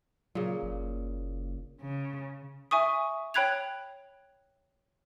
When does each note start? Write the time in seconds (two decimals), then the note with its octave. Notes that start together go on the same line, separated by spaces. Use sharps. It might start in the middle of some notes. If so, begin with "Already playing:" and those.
0.35 A#2 C#3 F#3
0.63 F#1
1.81 C#3
2.71 E5 G#5 C#6 D#6
3.34 C#5 G5 B5 F#6 G#6 F7